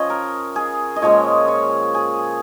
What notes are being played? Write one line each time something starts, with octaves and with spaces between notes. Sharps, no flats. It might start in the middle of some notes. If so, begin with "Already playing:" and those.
Already playing: F3 C#4 C#5 D#5
A#4
G#4
D#5
A#2 F3 G#3 C#4 C#5
C#5
G#4